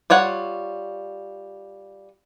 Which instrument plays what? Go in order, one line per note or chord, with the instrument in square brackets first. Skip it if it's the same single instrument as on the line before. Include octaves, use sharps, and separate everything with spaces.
[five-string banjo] G3 F4 C#5 F#5